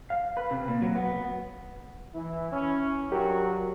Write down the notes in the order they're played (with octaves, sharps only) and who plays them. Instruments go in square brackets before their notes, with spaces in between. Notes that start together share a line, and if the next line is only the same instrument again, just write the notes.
[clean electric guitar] F5
B4
C3
A#2
F#3
B3
[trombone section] E3 [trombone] E4
[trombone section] C#4
[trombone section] G2 F#4 [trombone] F#3 [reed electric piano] G4 A#4